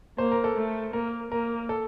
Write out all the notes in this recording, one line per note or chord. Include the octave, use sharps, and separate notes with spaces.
A#3 C5
A#4
A4
A3
A#3 A#4
A#3 A#4
A4